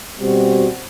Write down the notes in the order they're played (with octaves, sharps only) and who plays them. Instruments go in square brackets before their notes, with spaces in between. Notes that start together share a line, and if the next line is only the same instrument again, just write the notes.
[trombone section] B2 G3 C4 F#4